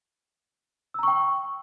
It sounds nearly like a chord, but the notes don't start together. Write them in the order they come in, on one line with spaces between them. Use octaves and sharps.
E6 A#5 C#6 G5